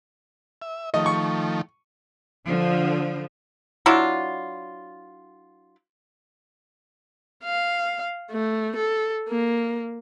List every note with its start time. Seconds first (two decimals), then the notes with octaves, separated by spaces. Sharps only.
0.62 E5
0.94 D#3 F3 A3 D#5
1.06 C#6
2.46 D3 F3
3.86 F#3 D4 E4 F4
7.44 F5
8.31 A3
8.76 A4
9.29 A#3